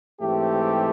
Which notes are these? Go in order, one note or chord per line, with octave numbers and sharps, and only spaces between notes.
G#2 E3 A3 C4 G4